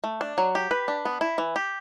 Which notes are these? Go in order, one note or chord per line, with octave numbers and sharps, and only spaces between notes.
A3
D4
F#3
G4
B4
D4
B3
E4
E3
G4